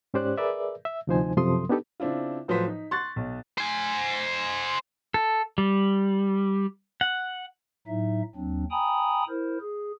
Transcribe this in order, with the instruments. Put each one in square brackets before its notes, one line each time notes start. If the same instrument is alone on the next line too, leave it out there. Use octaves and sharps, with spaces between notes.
[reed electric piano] G#2 C#4 G4 C5 D5 F#6
G#4 A#4 B4 D5 E5
E5
D2 C3 F3 D#4 C5 G#5
F#2 C3 F3 A4 C6 D#6
B3 D4 D#4 G4 A4 B4
[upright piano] C#3 C4 D4 E4 F4
A2 F3 F#3 B4 C5 B6
D#4
C6 C#6 F#6 A6
B1
[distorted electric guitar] C5 G#5
[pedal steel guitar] A4
G3
F#5
[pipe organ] A2 F#3 D#4 E5
D#2 F#3 C4 D4
G5 G#5 A#5 B5 D#6
E4 A#4 C5
G#4